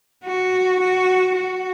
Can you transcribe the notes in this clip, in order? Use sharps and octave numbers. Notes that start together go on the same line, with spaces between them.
F#4
F#4
F#4